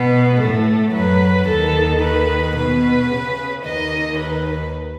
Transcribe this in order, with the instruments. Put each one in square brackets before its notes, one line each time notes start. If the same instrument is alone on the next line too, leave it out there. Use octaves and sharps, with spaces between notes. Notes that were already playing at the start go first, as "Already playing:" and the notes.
Already playing: [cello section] B2 B3 [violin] B4
[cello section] A2 A3 [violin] A4
[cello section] F#2 F#3 [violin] B4
[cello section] D#2 D#3 [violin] A4
[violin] B4
[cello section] B2 [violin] B4
[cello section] C#3
[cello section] D#2 D#3 [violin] D#5
[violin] B4